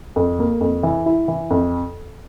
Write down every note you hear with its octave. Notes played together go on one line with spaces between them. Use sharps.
F2
A#3
F2
E3
E4
E3
F2